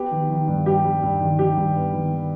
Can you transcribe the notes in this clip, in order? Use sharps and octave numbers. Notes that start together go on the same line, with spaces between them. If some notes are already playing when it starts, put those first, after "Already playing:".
Already playing: B3 G4
D#3
D#3
G2
G3 G4
G3
G2
D#3
D#3 G4
G2
B3
D#3